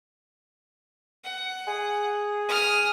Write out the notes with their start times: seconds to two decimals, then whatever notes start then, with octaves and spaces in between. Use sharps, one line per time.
1.24 F#5
1.67 G#4
2.49 D#6 F6